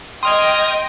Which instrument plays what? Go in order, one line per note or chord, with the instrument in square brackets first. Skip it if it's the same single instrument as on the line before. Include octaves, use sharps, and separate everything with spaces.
[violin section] D#5 G5 [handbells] C6 [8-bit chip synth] D#6 F6 G#6